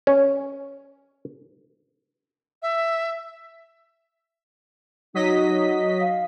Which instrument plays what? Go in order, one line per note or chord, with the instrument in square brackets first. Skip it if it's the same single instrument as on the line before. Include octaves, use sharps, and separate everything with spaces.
[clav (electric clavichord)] C#4
[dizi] E5
[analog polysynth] F#3 D#5 B6 [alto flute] D#4
[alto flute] F5